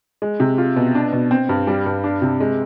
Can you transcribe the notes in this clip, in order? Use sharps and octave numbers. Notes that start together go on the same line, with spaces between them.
G#3
C3
F4
B2
D4
B2
C4
G2
G3
G2
D4
C3
G#3